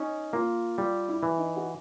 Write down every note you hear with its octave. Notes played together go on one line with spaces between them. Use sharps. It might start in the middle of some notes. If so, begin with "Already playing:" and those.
Already playing: C#4 D#4
A#3 F4
G3 F4
E4
E3
D#4
F#4